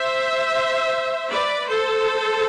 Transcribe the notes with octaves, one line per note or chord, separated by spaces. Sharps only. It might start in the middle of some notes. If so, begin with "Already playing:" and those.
Already playing: C5 E5
B4 D5
A4 C5